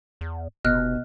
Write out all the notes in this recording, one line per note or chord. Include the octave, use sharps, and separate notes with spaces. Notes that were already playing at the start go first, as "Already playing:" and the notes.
E2
F1 B2 D#5 F6 F#6